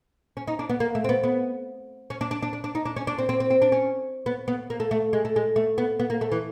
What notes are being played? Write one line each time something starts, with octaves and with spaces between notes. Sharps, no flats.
C#4
D#4
D4
B3
A#3
A3
C4
B3
B3
C#4
D4
D4
D4
D4
D4
D#4
D4
C#4
D4
C4
C4
C4
C4
D4
C#4
B3
B3
A#3
A3
A3
G#3
A3
G#3
A3
B3
B3
A#3
A3
E3